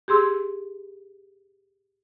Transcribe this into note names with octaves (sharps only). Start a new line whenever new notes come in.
G4 G#4 C6 E6